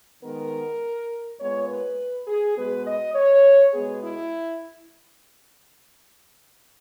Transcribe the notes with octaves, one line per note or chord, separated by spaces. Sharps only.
D#3 G#3 B3 A#4
A#2 G#3 B3 C#5
B4
G#4
B2 G#3 B3 B4
D#5
C#5
B2 G#3 B3 G#4
E4